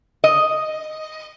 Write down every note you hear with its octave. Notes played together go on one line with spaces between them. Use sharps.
D#5